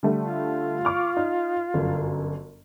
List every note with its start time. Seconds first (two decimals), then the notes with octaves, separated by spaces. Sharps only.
0.03 D3 G3 A3
0.22 F4
0.85 C#6 D6 F6
1.17 D#4
1.74 G1 F#2